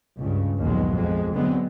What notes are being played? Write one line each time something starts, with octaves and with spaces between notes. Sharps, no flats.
C#2 G2 C#3
A#1 D#2 F#3 G#3 B3
F2 G#3
D3 F#3 G#3 B3 C4